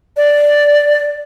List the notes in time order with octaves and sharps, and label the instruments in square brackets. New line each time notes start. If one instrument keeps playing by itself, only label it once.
[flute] D5